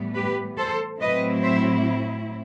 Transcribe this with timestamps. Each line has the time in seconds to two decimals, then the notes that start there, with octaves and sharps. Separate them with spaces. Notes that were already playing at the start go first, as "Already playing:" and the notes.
Already playing: A2 E3 G3 B3
0.14 G4 B4
0.57 A4 C5
0.99 A2 F#3 C4 E4 B4 D#5
1.42 C5 E5